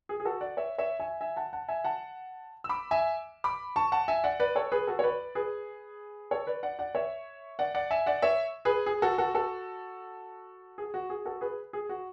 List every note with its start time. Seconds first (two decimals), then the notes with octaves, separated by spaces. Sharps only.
0.09 G#4
0.20 G#4
0.25 F#4 A4
0.41 D5 F#5
0.57 C#5 E5
0.78 C#5 E5
1.00 E5 G#5
1.21 E5 G#5
1.36 F#5 A5
1.53 F#5 A5
1.69 E5 G#5
1.84 F#5 A5
2.64 E6
2.69 B5 D6
2.91 E5 G#5
3.44 B5 D6
3.76 A5 C#6
3.92 F#5 A5
4.08 E5 G#5
4.24 D5 F#5
4.40 B4 D5
4.55 A4 C#5
4.72 G#4 B4
4.87 F#4 A4
4.99 C#5
5.04 B4 D5
5.35 G#4 B4
6.31 A4 C#5
6.47 B4 D5
6.63 D5 F#5
6.79 D5 F#5
6.95 C#5 E5
7.59 D5 F#5
7.75 D5 F#5
7.91 E5 G#5
8.06 D5 F#5
8.22 C#5 E5
8.65 G#4 B4
8.86 G#4
9.02 F#4 A4
9.18 F#4 A4
9.34 F#4 A4
10.78 G#4
10.94 F#4
11.10 G#4
11.25 F#4 A4
11.41 G#4 B4
11.73 G#4
11.89 F#4